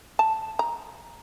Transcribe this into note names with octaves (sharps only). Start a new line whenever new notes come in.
A5
A#5